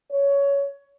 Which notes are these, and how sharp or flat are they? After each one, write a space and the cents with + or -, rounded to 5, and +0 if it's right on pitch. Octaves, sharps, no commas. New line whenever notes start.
C#5 +15